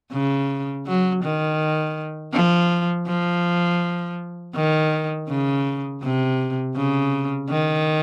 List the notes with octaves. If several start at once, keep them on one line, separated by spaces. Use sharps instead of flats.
C#3
F#3
D#3
F3
F3
D#3
C#3
C3
C#3
D#3